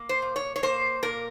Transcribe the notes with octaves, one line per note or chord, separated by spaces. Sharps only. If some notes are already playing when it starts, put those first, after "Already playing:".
Already playing: A#3
C5
A#2
C#5
C#5
A#3 C5
A#2 A#4